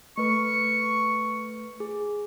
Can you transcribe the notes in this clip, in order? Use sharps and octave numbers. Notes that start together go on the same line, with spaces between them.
A3 B4 C#6
G#4